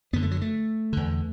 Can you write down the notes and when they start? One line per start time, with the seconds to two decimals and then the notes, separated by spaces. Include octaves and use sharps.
0.13 F#2 D3 B3
0.23 A3
0.31 F#3
0.42 A3
0.93 E2 D3